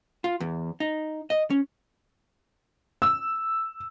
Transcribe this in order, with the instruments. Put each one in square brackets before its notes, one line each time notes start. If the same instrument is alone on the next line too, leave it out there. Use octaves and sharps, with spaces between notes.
[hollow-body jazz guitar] F4
E2
D#4
D#5
C#4
[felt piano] E6